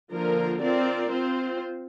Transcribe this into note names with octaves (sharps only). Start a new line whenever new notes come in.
D3 F3 A#3 F4 A#4
C4 F4 A#4 D5
C4 F4 C5